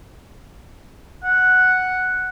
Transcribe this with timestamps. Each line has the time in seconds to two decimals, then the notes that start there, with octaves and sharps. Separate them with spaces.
1.24 F#5